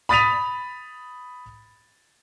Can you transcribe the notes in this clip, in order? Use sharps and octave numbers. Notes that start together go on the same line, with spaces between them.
B5 D#6 A6 B6 D#7 F7